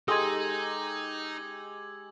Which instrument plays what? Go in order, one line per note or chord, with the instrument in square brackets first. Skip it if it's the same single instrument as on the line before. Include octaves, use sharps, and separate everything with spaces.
[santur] G#3 G4 [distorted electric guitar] D#4 [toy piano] A4 C6 [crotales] E6 G#6